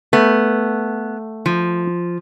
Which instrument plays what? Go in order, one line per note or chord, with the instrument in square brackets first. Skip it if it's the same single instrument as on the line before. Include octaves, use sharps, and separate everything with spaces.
[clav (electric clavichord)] A3 [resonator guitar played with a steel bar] B3
[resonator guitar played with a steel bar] F3